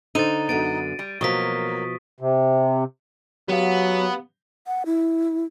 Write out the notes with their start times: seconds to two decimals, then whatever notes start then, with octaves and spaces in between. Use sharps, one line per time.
0.15 D3 D#4 C5 A6 D#7
0.49 F#2 D3 B3 A6 D7
0.99 G3
1.21 B2 F3 F#3 A#3 C#6 D#6 B6
2.20 C3
3.49 F#3 B3 G4 F5
4.67 F#5
4.86 E4